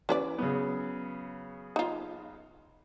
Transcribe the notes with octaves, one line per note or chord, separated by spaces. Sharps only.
E3 C#4 B4 D5
C#3 F#3 B3
D#4 F4